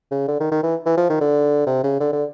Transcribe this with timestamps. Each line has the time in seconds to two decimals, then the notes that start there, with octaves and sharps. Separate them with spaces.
0.11 C#3
0.28 D3
0.40 D#3
0.51 D#3
0.63 E3
0.85 E3
0.97 F3
1.09 D#3
1.21 D3
1.66 C3
1.83 C#3
2.00 D3
2.12 D3